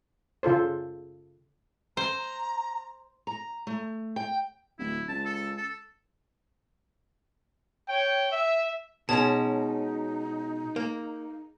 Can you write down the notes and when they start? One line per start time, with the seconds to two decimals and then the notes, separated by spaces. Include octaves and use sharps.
0.43 C#3 F4 A4 C5
1.97 C5 A#5
3.27 A#5
3.67 A3
4.16 G5
4.79 D1 E4
5.08 C#2 A5
5.25 A4
5.57 A4
7.89 C#5 G5
8.32 E5
9.09 B2 G#3 C#4 D#4 G#4 C#5 A5
10.76 A#3